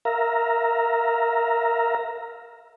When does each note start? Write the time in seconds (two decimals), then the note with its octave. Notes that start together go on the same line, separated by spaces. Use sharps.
0.05 A#4 E5 F5 A#5